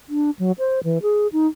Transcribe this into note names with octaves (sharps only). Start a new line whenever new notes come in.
D4
F#3
C5
E3
G#4
D#4